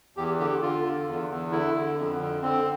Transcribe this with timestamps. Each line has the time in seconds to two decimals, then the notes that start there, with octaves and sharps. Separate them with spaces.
0.17 E2 G4
0.39 D3 G4
0.61 D3 F4
0.84 D3
1.07 E2
1.30 E2
1.52 D3 E4
1.74 D3
1.97 F2
2.20 D3
2.42 D3 C4